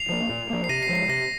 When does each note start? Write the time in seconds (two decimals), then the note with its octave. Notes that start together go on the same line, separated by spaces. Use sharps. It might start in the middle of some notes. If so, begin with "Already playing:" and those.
Already playing: C7 F7
0.09 F3 A#3
0.30 A#2
0.50 F3 A#3
0.64 C7
0.69 C3 A#6 D#7
0.83 C7
0.89 F3 G#3
0.95 C7
1.08 C3 A#6